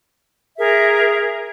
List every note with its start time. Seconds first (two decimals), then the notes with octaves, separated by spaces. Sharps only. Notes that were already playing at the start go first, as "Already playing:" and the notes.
0.58 G#4 A#4 E5